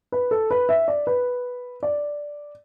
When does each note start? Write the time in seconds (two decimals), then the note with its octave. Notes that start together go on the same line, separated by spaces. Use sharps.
0.12 B4
0.31 A4
0.51 B4
0.69 E5
0.88 D5
1.07 B4
1.83 D5